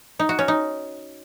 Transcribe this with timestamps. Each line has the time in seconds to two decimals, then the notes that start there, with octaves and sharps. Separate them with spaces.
0.19 D#4
0.29 F#4
0.39 C#4
0.48 D#4